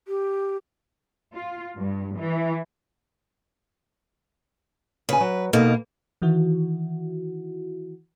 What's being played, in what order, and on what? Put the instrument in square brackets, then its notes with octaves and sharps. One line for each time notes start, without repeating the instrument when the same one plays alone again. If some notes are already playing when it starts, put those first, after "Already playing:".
[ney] G4
[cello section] F4
G2
E3
[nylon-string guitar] C#3 G#5 [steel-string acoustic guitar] B4
[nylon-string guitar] F#3
[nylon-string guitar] B2 D#4 A4 [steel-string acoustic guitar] A#3
[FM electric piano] D#3 E3 E4 F#4